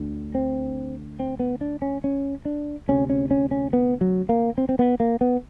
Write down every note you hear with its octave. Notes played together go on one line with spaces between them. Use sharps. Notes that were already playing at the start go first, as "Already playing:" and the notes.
Already playing: D2 D3
C4
C4
B3
D4
C#4
C#4
D4
D2 C3 C#4
C#4
C#4
C#4
B3
F#3
A#3
C4
C4
B3
A#3
B3